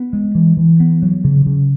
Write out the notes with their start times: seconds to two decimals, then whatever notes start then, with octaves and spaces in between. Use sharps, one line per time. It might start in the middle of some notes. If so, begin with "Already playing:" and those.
Already playing: B3
0.13 G#3
0.35 E3
0.57 E3
0.80 B3
1.02 F#3
1.24 C#3
1.46 C#3